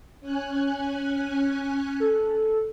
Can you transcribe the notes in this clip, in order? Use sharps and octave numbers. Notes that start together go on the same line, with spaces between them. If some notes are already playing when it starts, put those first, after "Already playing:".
C#4 G#5 F#6
A4